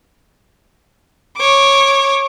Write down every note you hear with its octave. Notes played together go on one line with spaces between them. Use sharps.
C#5 D6